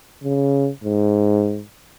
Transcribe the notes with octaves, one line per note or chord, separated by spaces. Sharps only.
C#3
G#2